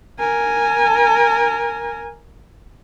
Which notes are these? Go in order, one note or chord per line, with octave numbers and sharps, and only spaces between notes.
A#4 G#5